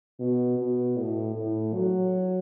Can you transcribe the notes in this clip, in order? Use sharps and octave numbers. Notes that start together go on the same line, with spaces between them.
B2
B2
A2
A2
F#3